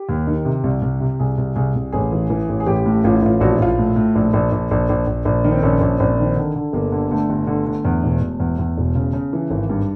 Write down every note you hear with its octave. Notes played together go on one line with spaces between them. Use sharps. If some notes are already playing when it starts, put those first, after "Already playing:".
Already playing: G4
D#2
D#3
C3
C2
C2
C3
C2 G#4
C2
C2 G#4
C2
A1 G#4
E3
E3
A1
G#4
A1 G4
A2
A1 F4
E4
A1 F4
A#1 F#4
F4
E4
A#1 F4
A2
A2
A#1
A#1
A#1
A#1
A#1
A#1
A#1
D#3
C4
A#1 C#4
A#1
A#1 C4
D#3
D3
D3
G1 A#3
D3
D3 A3
G1
D3
D3
E2
E1
E1
E2
E2
E1
C#3
C#3
E3
G#1
G2